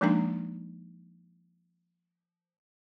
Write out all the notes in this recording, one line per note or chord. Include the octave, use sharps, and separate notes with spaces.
F3 G#3 A#3 D4 D#4 A#5